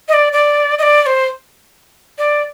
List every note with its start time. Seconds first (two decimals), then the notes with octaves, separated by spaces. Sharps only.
0.08 D#5
0.13 D5
0.33 D5
0.79 D#5
0.83 D5
1.02 D5
1.06 C5
2.18 D5